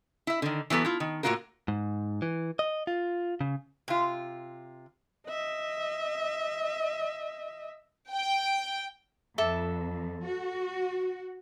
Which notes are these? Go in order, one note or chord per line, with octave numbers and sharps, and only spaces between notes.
E4 E5
D3 D#3
E3 F#3 B3 A4
E4 F4
D#3
A2 F3 A#3 F4 F#4 A#4
G#2
E3
D#5
F4
C#3
C3 F4
D#5 E5
G5
F2 A4 E5 D6
F#4